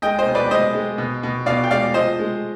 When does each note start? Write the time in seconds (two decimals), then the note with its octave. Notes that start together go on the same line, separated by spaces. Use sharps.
0.02 G#3 D#5 G5
0.18 C5 D#5
0.26 B2
0.35 B4 D5
0.50 G#3 C5 D#5
0.74 G#3
0.98 B2
1.23 B2
1.46 B2 D5 F5
1.64 G5
1.70 G#3 D5 F5
1.94 F3 C5 D#5
2.19 G#3